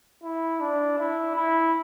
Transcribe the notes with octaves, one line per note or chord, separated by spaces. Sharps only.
E4
D4
E4
E4